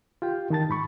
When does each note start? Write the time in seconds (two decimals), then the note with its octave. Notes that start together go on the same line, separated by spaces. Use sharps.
0.22 F4 G4 G5
0.50 D#3 D#4 A5 A6
0.69 G#2 B5 C#6